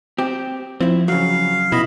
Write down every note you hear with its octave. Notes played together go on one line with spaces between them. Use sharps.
C4 G4
F3 C4 E4
C#3 F#3 F5
B2 E4 D#5 B5